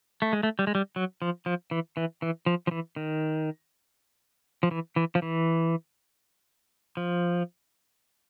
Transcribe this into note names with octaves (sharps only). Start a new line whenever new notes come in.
A3
G#3
A3
G3
G#3
G3
F#3
F3
F3
E3
E3
E3
F3
F3
E3
D#3
F3
E3
E3
F3
E3
F3